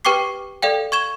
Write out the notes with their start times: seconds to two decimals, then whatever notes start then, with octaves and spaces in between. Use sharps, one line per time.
0.05 G4 B4 G5 C#6 D6 C7
0.62 A4 D5 F5 G5
0.92 C#6 G#6 E7 G7